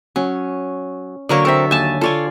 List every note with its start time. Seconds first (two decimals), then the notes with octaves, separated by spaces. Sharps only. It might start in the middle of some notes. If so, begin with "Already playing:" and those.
0.16 F#3 C#4
1.29 D3 F#3 A#3 A#4 C#5 D5
1.45 C4 A4 A#4 E5
1.71 D#2 G#5 A5
2.01 F4 A4 C#5 D5 G#5